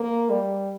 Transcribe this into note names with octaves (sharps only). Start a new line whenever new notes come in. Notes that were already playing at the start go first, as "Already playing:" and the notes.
Already playing: A#3
G3